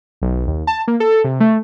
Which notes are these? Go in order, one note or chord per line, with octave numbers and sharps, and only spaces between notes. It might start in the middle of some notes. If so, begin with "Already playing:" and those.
B1
D#2
A5
A#3
A4
C3
A3